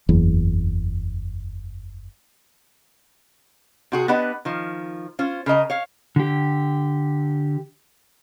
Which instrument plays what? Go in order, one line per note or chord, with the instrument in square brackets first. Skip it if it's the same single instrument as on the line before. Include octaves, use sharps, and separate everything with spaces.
[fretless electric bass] F#1 E2
[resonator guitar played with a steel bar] C3 F#4 G#4
B3 D4 G4 B4 D#5 F#5
D#3 F3
C#4 F4 C5
C#3 A#4 D#5 A#5
C#5 F5
[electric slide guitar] D3 G4